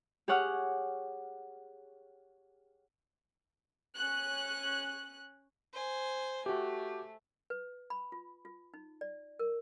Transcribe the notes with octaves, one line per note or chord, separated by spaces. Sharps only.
G4 G#4 C#5 F#5 D6 F6
C#4 F#6
C5 G#5
A3 F#4 G4
B4
B5
F4
F4
D#4
D5
A#4